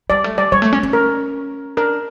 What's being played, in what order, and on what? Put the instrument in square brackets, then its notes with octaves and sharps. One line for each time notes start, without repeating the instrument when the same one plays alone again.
[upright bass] G3 [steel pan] D5
[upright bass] A3
[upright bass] G3 [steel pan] D5
[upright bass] G3 [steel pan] C#5
[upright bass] A3
C#4
C#4
[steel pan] A#4
[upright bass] D4 [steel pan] A#4